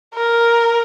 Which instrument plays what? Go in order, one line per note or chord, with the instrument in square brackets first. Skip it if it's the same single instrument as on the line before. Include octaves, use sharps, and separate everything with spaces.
[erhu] A#4